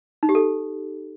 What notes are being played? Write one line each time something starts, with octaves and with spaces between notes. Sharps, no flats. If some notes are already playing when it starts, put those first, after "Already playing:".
D#4
G4
A4